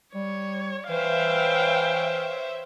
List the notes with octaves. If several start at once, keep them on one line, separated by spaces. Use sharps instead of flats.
G3 C#5
E3 C5 C#5 E5 F5 G5